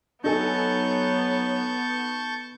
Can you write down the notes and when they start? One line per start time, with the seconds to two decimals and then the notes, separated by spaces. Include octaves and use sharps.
0.24 F#3 B3 D#4 A4 G#5 A5 C#6 G6